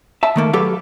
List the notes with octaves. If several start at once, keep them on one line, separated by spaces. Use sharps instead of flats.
E5 A5
D#3 A3 A#3
F#3 G4 A4 B4 F5